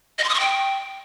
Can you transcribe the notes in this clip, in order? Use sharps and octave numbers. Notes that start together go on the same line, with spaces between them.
D#5
C6
D#6
C#6
G5